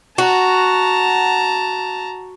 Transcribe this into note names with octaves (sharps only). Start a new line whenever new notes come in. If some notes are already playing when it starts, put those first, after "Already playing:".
F#4 A5 A#5